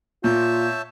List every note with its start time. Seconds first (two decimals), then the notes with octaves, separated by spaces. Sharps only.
0.24 A#2 F4 C#5 E5 A5 G6